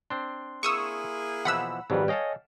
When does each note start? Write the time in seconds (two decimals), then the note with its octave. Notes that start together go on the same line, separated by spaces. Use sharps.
0.10 C4 D4 C6
0.63 A#3 E4 G#4 C#6 D#6 E6
1.45 B2 E3 F3 F#5 B5 E6
1.90 G#1 F2 G#2 F#3 G3 B4
2.08 A4 C#5 D#5 F5 G5 G#5